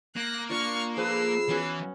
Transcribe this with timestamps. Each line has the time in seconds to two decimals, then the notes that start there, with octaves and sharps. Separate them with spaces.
0.16 A#3 F#6 A#6
0.50 D4 F4 C#6 F6
0.97 F3 G#4 A4 B4 E6 C7
1.49 E3 B3 C#4 F#4